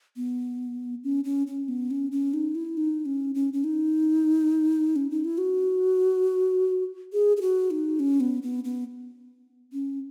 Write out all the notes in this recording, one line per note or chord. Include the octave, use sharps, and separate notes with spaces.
B3
C#4
C#4
C#4
B3
C#4
C#4
D#4
E4
D#4
C#4
C#4
C#4
D#4
C#4
D#4
E4
F#4
G#4
G#4
F#4
D#4
C#4
B3
B3
B3
C#4